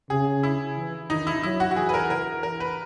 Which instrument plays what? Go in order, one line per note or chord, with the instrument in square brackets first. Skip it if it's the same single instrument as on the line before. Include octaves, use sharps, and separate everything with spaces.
[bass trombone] C#3 [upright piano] G#4
[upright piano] E4
[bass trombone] E3
[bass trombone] D#3 [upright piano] D#4
[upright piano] E4
[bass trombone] F#3 [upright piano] E4
[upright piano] F#4
F#4
[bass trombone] E3 [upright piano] G#4
[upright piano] B4
A#4
A#4
A#4
B4